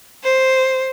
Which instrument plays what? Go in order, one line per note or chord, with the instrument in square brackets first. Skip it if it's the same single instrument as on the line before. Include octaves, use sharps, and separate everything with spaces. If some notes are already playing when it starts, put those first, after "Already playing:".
[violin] C5